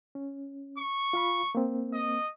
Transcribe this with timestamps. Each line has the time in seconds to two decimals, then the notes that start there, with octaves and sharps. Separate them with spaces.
0.15 C#4
0.78 C#6
1.13 F4 F5 B5
1.55 A#3 C4
1.93 D#5